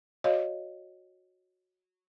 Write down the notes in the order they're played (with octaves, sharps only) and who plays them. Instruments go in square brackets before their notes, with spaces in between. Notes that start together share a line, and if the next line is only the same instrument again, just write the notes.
[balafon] F#4 C#5 D#5 F5